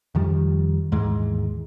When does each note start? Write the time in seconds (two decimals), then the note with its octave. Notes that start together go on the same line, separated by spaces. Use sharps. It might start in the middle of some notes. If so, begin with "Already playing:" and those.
0.15 F2 D#3 F3 G3
0.92 D#2 G#2 E3 G#3